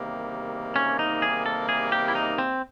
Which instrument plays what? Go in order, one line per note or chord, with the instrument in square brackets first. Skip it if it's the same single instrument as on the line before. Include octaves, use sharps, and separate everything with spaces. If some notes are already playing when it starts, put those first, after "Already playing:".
Already playing: [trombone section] E2 C3 D#3 G3 A#3
[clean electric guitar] C#4
D#4
G#4
A4
G#4
G4
E4
D#4
C4